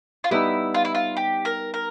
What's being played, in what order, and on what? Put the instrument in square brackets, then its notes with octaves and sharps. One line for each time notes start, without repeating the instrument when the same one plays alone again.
[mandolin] F4
[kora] G3 B3 D#4 [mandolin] E4
[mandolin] F4
E4
F4
G4
A#4
A#4